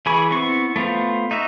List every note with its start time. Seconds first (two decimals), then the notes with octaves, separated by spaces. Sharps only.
0.06 E3 G#4 B5 C#6
0.30 B3 C4 E4 C#6
0.76 A3 B3 F4 C5
1.31 D#4 F#4 E5